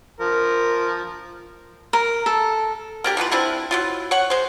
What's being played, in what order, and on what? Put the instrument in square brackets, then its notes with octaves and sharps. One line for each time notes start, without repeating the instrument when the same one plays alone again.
[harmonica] F3 A#4
[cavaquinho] A#4
A4
[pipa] A#3 D4 G4 A#4
E3 B3 F4 B4
C4 D4 E4 F4
F#3 E4 F4
C#5 F#5
G#3 C5